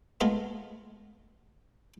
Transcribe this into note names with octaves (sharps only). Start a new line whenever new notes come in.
G#3 A3 B3 F4 G#4 A#4